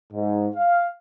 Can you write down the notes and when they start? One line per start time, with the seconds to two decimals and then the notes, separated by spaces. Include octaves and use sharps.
0.13 G#2
0.54 F5